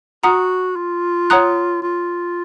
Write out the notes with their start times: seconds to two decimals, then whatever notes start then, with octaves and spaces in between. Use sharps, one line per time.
0.23 F#4 F#5 A#5 D#6
0.76 F4
1.30 C#5 F#5 A#5 D#6 F#6
1.82 F4